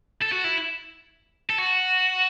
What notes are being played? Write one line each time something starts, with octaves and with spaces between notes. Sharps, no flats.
A4
F#4
E4
A4
F#4